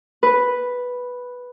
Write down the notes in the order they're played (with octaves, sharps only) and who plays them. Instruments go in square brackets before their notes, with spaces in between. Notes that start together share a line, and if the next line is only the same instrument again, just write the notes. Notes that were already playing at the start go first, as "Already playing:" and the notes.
[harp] B4